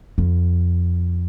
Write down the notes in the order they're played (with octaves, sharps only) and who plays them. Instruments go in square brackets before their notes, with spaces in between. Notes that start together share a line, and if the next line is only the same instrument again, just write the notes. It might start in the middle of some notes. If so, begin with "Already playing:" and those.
[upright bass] F2